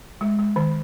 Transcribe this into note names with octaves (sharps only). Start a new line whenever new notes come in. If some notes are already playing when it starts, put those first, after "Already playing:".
G#3
G#3
D#3